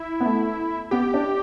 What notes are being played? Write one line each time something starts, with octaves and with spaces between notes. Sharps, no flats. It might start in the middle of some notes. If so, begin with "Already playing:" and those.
Already playing: E4
B3
A3
B3 G4
D4